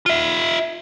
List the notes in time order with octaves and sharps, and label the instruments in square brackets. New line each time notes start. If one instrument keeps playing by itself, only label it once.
[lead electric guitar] F4 E5